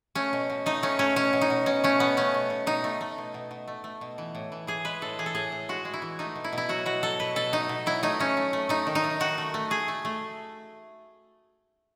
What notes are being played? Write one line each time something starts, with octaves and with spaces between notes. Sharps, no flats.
A3 C#4
B2
B2
A3 D#4
A3 C#4
A3 C#4
B2 C#4
B2
D#4
B2
B2 C#4
A3 C#4
B2 B3
A3 C#4
B2
B2
B2 D#4
A3
A3
B2
B2
B2
A3
A3
B2
E3
A2
E3
E3 G#4
G#3 B4
A2 A4
E3 G#4
A4
A2 G#4
A2
G#3 F#4
G#3
E4
E3
A3 D#4
B2
E4
B2
E4
F#3 F#4
B2 F#4
F#3 A4
B2 B4
B2 A4
A3 D#4
B2
F#3 E4
A3 D#4
A3 C#4
A3
A3
A3 D#4
D#3
D#4
A3
D#3 F#4
A3
A3
A3 G#4
A3
A3